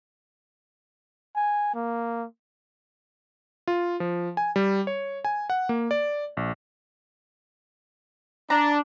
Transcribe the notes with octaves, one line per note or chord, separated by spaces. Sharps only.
G#5
A#3
F4
F3
G#5
G3
C#5
G#5
F#5
A#3
D5
A#1
D4 A#5